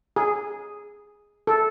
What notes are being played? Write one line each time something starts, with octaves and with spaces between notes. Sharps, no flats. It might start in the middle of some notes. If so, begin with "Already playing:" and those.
G#4
A4